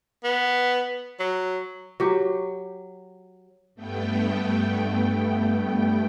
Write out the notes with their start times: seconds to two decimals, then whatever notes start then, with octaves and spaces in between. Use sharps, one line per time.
0.24 B3
1.19 F#3
2.00 F#3 G4
3.75 G2 A3 B3 G5